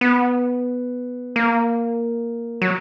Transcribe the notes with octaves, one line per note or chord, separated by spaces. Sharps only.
B3
A#3
F#3